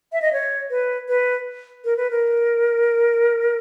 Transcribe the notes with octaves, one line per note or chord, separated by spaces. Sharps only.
E5
D#5
C#5
B4
B4
A#4
B4
A#4